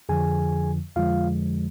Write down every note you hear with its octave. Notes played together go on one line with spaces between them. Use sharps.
F2 D3 F3 G#4 G#5
F2 D3 F3 G#3 F4 F5